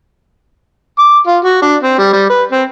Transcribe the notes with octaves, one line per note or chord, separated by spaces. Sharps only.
D6
F4
F#4
D4
C4
G3
G3
B4
C4